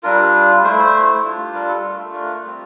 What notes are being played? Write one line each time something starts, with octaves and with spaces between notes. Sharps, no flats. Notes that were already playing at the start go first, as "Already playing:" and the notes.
G3 D4 F4 A#4
A3 E4 C5
C5
G3 D4 F4
A#4
A4
A3 D4 F4 A#4
A#4
G3 C4 F4